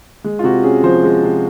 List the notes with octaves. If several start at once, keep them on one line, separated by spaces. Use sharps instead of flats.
G#3
F4
C3 F#4
C#4 G#4
F3 C5
G#3
C3